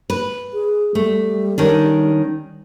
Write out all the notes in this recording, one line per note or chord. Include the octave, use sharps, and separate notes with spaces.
B4
G#4
G3 A3
D#3 C#4 D4